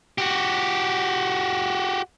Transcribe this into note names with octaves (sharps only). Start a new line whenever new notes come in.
F#4 G4